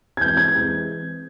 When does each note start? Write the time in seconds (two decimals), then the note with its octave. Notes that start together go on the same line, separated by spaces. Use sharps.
0.17 G#6
0.21 E3 G#3 C4 G6
0.37 G#6
0.54 E3 G#3 C4